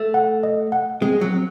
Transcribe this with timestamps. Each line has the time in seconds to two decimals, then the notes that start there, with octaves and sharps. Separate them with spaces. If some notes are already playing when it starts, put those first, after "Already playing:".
Already playing: A3
0.14 F#5
0.43 D#5
0.72 F#5
1.01 G#3 C4
1.21 F#3
1.30 C4